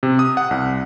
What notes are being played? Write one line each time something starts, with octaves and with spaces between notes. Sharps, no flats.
C3
D#6
F#5
C2